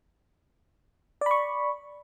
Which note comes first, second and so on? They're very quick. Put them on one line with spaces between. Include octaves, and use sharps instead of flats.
D5 B5 C#6